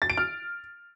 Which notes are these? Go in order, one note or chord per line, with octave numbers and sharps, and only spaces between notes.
A6
D7
F6